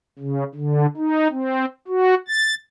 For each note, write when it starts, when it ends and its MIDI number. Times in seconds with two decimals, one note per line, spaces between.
0.19 0.44 49
0.55 0.86 50
0.97 1.28 63
1.31 1.65 60
1.88 2.14 66
2.28 2.54 93